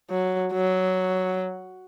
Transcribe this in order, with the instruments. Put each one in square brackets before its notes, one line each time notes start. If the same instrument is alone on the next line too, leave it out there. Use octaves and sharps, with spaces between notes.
[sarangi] F#3
F#3